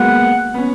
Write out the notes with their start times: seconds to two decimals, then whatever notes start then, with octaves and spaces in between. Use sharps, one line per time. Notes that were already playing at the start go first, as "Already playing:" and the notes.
Already playing: F#3 G#3 A#3 B3 F#5
0.54 B3
0.58 C#4